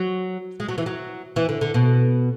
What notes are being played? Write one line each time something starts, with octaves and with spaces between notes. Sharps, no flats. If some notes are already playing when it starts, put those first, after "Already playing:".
Already playing: F#3
G#3
F#3
E3
F#3
E3
D3
D3
B2